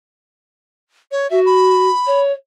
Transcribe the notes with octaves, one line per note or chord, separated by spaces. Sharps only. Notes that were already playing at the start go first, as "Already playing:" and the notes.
C#5
F#4 E5
B5
C#5